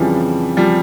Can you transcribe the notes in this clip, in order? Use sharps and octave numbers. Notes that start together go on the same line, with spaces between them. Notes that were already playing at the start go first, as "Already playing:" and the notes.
Already playing: F2 C#3 E3 F3 G3
F3 G3